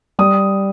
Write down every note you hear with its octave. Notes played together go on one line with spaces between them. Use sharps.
G3 D#6